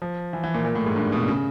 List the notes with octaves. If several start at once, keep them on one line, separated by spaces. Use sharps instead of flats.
F3
E3
E3
A#2
A#2
A2
G#2
G2
B2
C#3